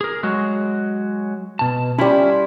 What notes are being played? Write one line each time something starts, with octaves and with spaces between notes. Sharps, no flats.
G#4 A#4
F#3 G#3 F#4
B2 A5
G3 C#4 E4 F4 B5